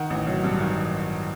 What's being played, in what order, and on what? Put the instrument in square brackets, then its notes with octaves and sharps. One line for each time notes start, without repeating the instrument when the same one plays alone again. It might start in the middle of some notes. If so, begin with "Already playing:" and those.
Already playing: [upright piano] D#3 F#5
A1
F#3
G2
D#3